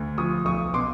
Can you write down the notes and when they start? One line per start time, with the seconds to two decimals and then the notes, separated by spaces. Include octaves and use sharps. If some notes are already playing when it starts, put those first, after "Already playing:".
Already playing: D2
0.18 F3 C#6 D#6
0.45 B1 C#6 D#6
0.74 B2 C6 D6